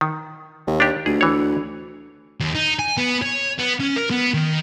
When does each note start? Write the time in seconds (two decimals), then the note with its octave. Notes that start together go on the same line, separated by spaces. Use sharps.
0.01 D#3
0.67 D#2
0.80 D4 G4
1.06 D2 G#4
1.21 E3 C#5
2.40 D#2
2.55 D#4
2.79 G#5
2.98 B3
3.22 C#5
3.59 B3
3.80 C#4
3.96 A#4
4.11 B3
4.34 D#3